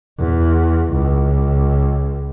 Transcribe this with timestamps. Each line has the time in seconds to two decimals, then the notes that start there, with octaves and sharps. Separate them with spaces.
0.19 E2
0.93 C#2